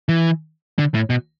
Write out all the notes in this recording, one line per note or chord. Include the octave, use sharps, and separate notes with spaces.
E3
D3
A2
B2